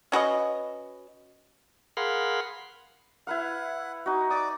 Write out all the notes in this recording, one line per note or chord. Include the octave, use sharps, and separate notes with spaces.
C#4 F#4 B4 D#5
G#4 A#4 F5 F#5 B5 C6
E4 B4 F5 F#5
D#4 F#4
D5 D6 D#6